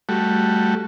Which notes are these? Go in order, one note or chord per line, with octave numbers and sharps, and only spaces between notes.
G3 A3 F#4